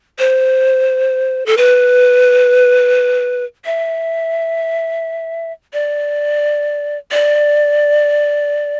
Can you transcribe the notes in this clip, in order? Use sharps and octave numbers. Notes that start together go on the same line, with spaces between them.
C5
A4
B4
E5
D5
D5